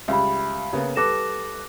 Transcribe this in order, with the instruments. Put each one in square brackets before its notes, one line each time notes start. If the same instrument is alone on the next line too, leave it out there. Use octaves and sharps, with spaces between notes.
[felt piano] C#2 G3 [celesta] E5 B5
[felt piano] C#3 A#3 B3
[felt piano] G3 A4 B4 [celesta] D6 A#6 E7